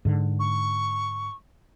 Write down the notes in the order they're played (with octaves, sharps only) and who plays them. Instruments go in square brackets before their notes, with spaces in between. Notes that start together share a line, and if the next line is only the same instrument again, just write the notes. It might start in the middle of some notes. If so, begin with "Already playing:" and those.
[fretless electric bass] G#2 D3
[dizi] C#6